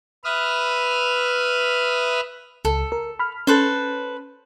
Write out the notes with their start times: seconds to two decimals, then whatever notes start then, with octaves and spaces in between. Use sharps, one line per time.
0.24 B4 E5 D#6 F6
2.65 C#2 A4
2.92 A#4
3.19 B5 F6
3.47 C#4 A4 B4 C5